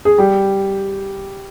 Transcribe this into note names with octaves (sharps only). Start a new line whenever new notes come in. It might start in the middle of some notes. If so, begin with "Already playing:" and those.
G#4
G3 G4